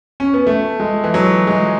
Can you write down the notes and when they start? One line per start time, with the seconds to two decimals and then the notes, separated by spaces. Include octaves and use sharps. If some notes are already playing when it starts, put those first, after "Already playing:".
0.20 C#4
0.34 B3
0.47 A3
0.80 G#3
1.04 E3
1.14 F#3
1.47 G#3